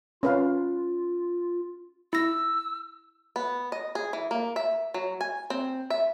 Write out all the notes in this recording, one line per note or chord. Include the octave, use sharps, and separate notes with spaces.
C#4 F4 B4 F5
E4 E6 A#6
B3
D#5
G#4
E3
A#3
E5
F#3
G#5
C4
E5